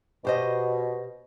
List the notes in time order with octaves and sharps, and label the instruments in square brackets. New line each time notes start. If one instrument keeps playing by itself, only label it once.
[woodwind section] B2 [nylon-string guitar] G4 C5 D#5